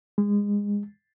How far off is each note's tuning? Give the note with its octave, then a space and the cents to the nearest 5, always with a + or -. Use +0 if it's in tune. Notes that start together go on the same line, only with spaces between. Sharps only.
G#3 -25